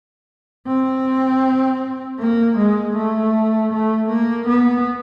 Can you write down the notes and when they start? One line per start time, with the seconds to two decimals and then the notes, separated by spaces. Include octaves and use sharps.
0.67 C4
2.19 A#3
2.57 G#3
2.96 A3
3.72 A3
4.09 A#3
4.47 B3